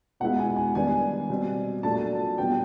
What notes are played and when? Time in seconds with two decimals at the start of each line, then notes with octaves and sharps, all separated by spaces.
0.20 B2 G#3 B3 E4 F#5
0.39 G#5
0.56 G#5
0.75 D#3 G3 B3 D4 G#5
1.29 B2 G3 C4
1.83 A#2 F#3 A3 D4 A5
2.38 B2 G3 B3 D4 G5